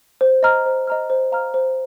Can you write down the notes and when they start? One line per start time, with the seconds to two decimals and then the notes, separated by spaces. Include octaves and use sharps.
0.21 C5
0.43 D#5 A#5 F6
0.66 C5
0.87 D#5 A#5 F6
1.10 C5
1.32 F5 A#5 F6
1.54 C5